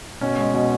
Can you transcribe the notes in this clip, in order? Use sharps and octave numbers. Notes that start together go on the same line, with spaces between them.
B2 C#4
G#3
B2